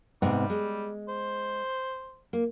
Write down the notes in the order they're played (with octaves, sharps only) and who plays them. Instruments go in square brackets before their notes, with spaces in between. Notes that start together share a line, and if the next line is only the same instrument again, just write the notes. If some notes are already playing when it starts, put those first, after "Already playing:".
[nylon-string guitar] G#2 C3 B3 [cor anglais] G3
[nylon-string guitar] G#3
[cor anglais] C5
[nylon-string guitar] A#3